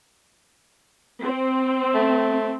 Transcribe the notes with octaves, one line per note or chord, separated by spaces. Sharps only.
C4
A3